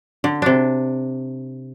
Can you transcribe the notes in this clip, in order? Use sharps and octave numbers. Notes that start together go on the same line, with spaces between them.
D3
C3 D4